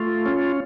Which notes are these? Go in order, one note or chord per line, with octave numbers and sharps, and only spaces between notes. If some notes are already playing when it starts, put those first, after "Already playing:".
Already playing: A3 F4
C#4